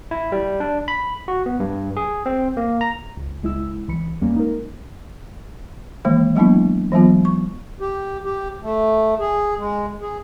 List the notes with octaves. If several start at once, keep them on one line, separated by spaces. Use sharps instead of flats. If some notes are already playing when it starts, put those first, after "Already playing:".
E4
G3
D4
B5
F#4
B3
G2
G#4
C4
A#3
A#5
C#2
C#2 G#3 E4 E6
C2 E3 B5 C#7
E2 G3 G#3 A#3 C#4
D#4 A#4
D#3 E3 G#3 A#3
F#3 G#3 A#3 B3 D4 E4
E3 F#3 G#3 B3 F4
C#6
G4
G4
A3
G#4
G#3
G#4